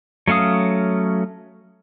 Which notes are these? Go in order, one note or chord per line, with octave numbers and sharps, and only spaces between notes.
F#3 A3 C#4 F5 D#6